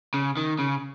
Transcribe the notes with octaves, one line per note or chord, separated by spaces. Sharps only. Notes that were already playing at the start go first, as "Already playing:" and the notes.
C#3
D#3
C#3